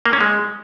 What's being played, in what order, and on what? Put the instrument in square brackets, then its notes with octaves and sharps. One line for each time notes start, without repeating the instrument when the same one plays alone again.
[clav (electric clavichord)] A#3
C#4
G#3